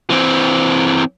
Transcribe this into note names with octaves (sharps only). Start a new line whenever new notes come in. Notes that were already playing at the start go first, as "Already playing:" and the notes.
E3 C4